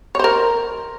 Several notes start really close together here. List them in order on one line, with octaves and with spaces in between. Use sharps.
C#5 C5 A#4